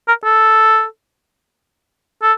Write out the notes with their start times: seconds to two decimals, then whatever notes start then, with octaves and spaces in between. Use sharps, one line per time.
0.08 A#4
0.24 A4
2.23 A4